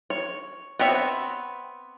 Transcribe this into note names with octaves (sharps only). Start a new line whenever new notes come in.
C#5
B3 C4 C#5 E5